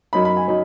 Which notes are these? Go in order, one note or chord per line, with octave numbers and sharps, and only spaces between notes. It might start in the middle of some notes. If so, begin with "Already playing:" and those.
F#2 F#3 D#4 B5
B5
G#5
F#3 D#4